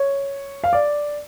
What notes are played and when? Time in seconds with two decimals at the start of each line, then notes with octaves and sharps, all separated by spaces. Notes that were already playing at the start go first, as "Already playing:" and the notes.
Already playing: C#5
0.64 F5
0.73 D5